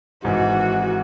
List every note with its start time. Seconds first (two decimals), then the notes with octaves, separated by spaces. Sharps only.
0.24 G#1 G#2 E3 F#4